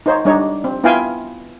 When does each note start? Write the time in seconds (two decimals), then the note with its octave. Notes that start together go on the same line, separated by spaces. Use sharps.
0.06 D#4 C5 C#5
0.25 G3 D4 D#4 C#5
0.64 C4
0.84 B3 E4 F4 F5 G5 G#5